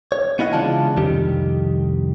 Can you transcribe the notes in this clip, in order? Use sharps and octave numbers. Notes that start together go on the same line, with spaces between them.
C#5
B3 E4 D#5 F5 F#5
C#3 E3 G#3 D4 F4 A5
C2 F2 D#3 G4